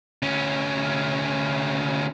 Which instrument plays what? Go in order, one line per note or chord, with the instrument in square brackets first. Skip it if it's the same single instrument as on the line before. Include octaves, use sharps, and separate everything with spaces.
[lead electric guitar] D2 C#4